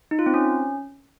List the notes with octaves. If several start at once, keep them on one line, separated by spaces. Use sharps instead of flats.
D#4
F4
C4
C#4